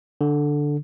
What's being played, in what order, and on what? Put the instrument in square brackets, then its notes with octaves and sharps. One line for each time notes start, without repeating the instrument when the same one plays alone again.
[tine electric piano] D3